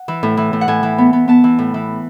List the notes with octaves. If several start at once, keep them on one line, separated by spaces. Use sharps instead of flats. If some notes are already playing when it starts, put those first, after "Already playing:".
Already playing: F#5
E3
A2
E3
A2
F#5
A2 G#5
E3
B3
B3
B3 A5
E3
A2
E3